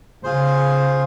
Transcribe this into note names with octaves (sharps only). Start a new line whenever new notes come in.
C#3 F4 G#4 C5